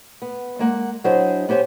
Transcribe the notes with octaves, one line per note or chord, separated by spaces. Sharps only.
B3
G#3 A#3 F#5
F#3 D4 E4 G#4 C5 D#5
B3 G4 C5 C#5 G#5